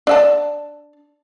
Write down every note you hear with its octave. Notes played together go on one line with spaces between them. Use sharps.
D4 E5 A5